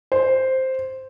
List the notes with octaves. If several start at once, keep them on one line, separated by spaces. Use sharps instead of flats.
C5